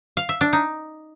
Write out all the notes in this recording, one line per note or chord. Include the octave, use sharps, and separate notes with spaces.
F5
E5
D4
D#4